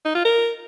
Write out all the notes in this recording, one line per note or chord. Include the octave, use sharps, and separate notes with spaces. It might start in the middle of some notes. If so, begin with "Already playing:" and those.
D#4
F4
A#4